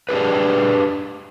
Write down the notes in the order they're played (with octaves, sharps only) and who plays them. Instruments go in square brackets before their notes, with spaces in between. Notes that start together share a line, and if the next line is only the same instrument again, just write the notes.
[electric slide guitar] D4 G4 G#4 B4